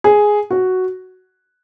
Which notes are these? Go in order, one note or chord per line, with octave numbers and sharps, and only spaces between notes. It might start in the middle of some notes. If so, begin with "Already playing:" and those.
G#4
F#4